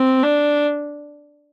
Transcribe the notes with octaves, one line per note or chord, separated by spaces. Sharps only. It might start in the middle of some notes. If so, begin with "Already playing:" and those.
Already playing: C4
D4